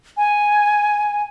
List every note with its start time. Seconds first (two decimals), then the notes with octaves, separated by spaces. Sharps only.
0.17 G#5